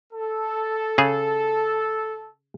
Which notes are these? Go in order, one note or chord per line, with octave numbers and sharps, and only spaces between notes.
A4
C#3 G#4